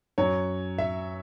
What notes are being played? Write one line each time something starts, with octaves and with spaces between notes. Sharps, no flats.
F#2 F#3 C#4 C#5
E5